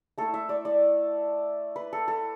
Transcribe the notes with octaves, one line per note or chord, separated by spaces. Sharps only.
A3 E4 A4
E5
D5
D5
B4
A4
A4